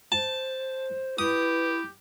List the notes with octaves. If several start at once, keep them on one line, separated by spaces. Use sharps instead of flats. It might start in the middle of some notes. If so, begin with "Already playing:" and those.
C5 A5
E4 G4 B4 D#6